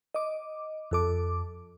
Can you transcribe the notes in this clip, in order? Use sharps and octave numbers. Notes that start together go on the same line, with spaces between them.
D#5 D6
F2 A4 D6